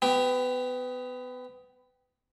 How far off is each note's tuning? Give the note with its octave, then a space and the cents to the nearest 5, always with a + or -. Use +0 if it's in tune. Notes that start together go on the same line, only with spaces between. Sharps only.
B3 +25 G4 +0